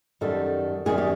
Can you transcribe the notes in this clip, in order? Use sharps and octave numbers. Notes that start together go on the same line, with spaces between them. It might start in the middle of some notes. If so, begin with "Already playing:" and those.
F#2 D#3 G3 A4
F#2 D#3 G3 G#4
G4